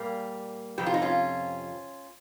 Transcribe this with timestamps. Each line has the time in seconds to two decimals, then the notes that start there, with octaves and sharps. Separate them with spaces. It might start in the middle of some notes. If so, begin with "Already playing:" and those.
Already playing: A#2 G3 A#3
0.78 F2 C3 G4
0.86 F4
0.94 D#4
1.02 C#4 F4